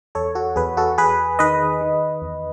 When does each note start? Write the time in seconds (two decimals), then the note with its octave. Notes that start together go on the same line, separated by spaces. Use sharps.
0.15 E2 A4 C#5
0.35 F#4 A4
0.56 E2 G#4 B4
0.77 F#4 A4
0.98 E2 G#4 B4
1.39 D#3 B4 D#5
1.81 D#3
2.22 E2